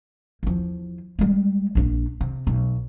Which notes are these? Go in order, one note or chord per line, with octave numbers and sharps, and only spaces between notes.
E2 F3
G3 G#3
A#1 D4
C3
B1